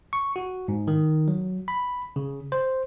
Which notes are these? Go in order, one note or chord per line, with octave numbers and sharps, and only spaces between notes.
C#6
F#4
G#2
D#3
F#3
B5
C#3
C5